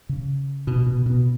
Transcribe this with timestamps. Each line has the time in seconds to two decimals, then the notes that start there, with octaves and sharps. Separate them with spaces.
0.09 C#3
0.67 B2
0.86 B2
1.06 B2